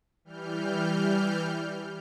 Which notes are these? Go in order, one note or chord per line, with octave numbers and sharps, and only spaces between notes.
E3 G3 F6 G6